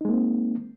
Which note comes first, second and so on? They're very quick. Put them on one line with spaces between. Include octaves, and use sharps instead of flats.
D#4 G#3 A#3 C4